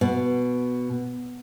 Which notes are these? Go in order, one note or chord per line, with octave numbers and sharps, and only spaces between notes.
B2